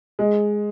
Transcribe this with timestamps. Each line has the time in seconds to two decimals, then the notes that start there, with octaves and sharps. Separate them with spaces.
0.19 G#3